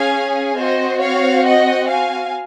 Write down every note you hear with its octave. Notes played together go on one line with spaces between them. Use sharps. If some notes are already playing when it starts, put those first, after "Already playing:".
Already playing: C#4 G#4 F5 G#5
C4 F#4 C5 D#5
C#5 F5
D#5 F#5
F5 G#5